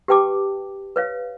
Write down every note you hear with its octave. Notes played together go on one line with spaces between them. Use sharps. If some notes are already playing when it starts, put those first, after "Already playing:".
G4 B4 G5 A5 D6
B4 C#5 F5